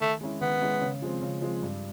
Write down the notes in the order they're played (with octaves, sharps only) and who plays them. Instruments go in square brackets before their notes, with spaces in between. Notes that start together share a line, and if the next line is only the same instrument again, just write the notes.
[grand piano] D#3 [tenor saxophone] A3
[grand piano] G#3 C#4 E4
[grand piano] D#3 [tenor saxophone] B3
[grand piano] G#3 C#4 E4
C#3
F3 G#3 C4
C#3
F3 G#3 C4
G2